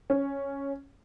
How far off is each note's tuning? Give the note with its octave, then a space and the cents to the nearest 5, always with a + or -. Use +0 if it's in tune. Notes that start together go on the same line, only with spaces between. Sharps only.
C#4 +0